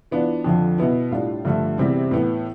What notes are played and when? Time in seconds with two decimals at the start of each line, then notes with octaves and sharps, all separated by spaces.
0.11 E3 B3 D4 F4
0.45 F2 D3 F3
0.78 B2 B3 E4
1.11 A2 G3 D4 F4
1.45 G2 D3 F3 A3
1.78 E2 C3 G3 C4 E4
2.11 A2 E3 B3